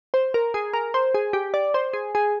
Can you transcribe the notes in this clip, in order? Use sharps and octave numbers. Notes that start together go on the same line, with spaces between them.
C5
A#4
G#4
A#4
C5
G#4
G4
D5
C5
G#4
G#4